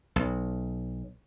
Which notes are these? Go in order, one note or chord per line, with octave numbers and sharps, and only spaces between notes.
B1